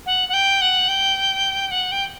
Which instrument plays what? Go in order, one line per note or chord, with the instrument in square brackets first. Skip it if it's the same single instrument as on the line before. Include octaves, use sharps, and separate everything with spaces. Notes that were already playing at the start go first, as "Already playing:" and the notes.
[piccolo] F#5
F#5
G5
F#5
G5
F#5
G5